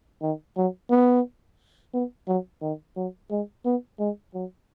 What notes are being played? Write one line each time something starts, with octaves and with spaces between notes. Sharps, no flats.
D#3
F#3
B3
B3
F#3
D#3
F#3
G#3
B3
G#3
F#3